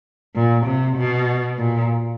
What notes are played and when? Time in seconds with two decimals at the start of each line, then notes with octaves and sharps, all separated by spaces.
0.35 A#2
0.66 C3
0.97 B2
1.58 A#2